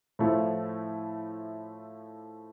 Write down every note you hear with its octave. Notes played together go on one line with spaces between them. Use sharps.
A2 F3 A3 E4